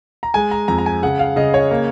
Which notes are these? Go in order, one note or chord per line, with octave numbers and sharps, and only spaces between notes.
A#5
G#3 G#5
A#5
F2 A#5
A#5
G#5
C#3 F#5
F5
C#3 D#5
C#5
A#3